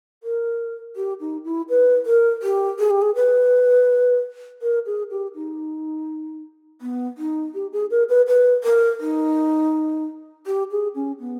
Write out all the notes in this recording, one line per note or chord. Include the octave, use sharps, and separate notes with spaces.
A#4
G4
D#4
E4
B4
A#4
G4
G#4
G4
G#4
B4
A#4
G#4
G4
D#4
B3
D#4
G4
G#4
A#4
B4
B4
A#4
D#4
G4
G#4
C#4
B3